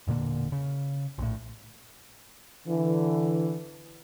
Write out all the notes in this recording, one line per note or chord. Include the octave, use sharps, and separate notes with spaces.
E1 A#2 D3 A#3
C#3
A#1 A2
D3 E3